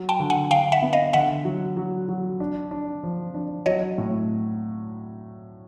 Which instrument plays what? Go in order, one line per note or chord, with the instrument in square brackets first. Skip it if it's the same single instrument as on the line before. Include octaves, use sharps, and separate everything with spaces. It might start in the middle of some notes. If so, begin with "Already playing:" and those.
Already playing: [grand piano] F#3
[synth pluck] G5 A5
[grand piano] D3
[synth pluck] F#5 G#5
[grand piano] D3 [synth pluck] F5 G5
[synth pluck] E5 F#5
[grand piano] B3
[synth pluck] D#5 F5
[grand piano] D3 [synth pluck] E5 F#5
[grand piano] F#3
F#3
F#3
D4
D4
F3
D4
[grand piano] F#3 [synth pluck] C#5 D#5
[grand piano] A2